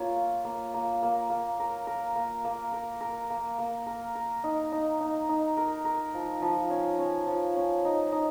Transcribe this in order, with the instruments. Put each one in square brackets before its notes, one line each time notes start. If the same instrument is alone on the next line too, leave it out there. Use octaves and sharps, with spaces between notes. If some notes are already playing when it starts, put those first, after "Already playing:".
Already playing: [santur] A#3 F4 C#5
F5
A#3
A#3
A#3
A#3
A#4
A#4
A#3
A#3
A#4
A#4
A#3
A#3
A#4
A#4
D#4
D#4
D#4
D#4
A#4
A#4
F3
F3
C#4
C#4
F3
C#4
D#4
D#4